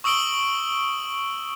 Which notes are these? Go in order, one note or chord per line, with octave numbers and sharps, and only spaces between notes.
C#6 D#6 E6 D7 F#7 G7